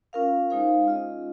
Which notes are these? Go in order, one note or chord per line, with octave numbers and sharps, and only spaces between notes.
C#4 F4 A#4 F5
G#3 D#4 G#4 C5 F5
G#3 C#4 F4 G#4 D#5